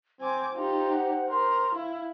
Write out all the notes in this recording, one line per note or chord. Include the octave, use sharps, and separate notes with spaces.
C4 C5 G#5 D6
D#4 F4 G4
F#5
A#4 C6
E4 F5